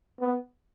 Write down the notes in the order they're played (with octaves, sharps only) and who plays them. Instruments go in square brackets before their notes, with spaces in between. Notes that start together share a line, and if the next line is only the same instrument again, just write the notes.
[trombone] B3